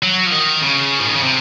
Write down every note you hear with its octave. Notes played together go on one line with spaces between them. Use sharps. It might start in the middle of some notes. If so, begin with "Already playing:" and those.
F#3
F3
D#3
C#3
F3
D#3
C#3
C3